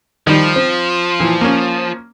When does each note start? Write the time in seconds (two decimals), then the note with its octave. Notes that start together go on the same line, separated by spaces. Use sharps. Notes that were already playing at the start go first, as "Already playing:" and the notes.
0.27 D#3 F3 G3
0.56 C4
1.20 A#2 E3
1.41 A#3 C#4